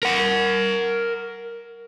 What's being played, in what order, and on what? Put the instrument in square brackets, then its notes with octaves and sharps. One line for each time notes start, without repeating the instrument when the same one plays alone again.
[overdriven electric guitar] A#4 F#5